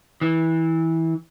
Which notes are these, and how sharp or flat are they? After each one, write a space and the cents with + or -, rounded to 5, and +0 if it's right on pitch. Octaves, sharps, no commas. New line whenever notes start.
E3 -20